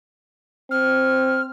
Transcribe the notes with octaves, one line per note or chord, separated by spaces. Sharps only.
C4 F6